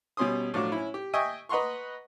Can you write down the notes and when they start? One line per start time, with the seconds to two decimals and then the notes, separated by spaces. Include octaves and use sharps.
0.17 B2 G3 C#4 C6 D#6
0.54 A2 F3 F#3 D4 D6
0.72 C#4 E4
0.94 G4
1.14 D#5 E5 G5 G#5 C#6 D#6
1.49 B4 D#5 F#5 A#5 C6 C#6